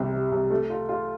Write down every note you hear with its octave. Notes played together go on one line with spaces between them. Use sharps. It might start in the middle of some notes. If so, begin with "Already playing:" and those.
Already playing: C2 C3
C3
C2
A3
F4
F4